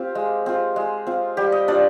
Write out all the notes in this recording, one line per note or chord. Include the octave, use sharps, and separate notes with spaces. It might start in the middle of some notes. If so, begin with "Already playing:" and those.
Already playing: C4 F4 G4
G#3
C4 F4
G#3
C4 F4
G3 G4
D#5
D4 F4 D5